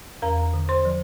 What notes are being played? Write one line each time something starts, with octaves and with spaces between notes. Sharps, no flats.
E2 A#4 A#5
D3
C5 C6
F3